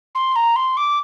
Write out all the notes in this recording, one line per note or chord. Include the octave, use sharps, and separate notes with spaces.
C6
A#5
C6
D6